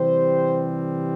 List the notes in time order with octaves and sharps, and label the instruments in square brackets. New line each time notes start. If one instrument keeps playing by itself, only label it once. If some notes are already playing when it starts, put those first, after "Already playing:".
Already playing: [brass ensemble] C3 E3 G3 C4 C5